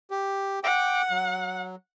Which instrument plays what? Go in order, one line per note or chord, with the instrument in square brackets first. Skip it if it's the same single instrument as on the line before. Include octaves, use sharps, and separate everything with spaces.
[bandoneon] G4
[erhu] F#5 [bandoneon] G5 D6
[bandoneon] F#3